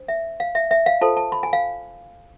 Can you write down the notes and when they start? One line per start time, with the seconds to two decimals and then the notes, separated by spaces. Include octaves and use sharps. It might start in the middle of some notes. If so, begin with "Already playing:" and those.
Already playing: D4 C5
0.08 E5
0.40 F5
0.55 E5
0.71 E5
0.86 F5
1.01 F4 A4 C5 A5
1.17 A5
1.32 B5
1.43 G#5
1.53 F5